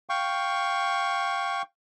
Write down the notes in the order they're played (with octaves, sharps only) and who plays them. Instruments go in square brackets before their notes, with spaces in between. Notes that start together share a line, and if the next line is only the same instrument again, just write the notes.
[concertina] F5 G5 C#6